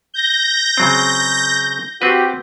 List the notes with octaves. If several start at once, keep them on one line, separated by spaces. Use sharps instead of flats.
G6 A#6
C#3 F#3 C4
C4 F#4 G4 B4